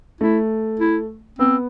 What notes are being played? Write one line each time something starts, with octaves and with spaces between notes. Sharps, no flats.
A3 E4
E4
B3 C4